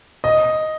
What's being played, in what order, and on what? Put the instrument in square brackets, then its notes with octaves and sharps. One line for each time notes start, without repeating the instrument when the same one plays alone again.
[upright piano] D#5